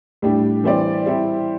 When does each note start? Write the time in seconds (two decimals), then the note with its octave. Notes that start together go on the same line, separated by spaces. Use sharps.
0.22 A2 G3 D4 G4
0.64 E3 G3 C4 G4 D5
1.06 G3 C4 E4 G4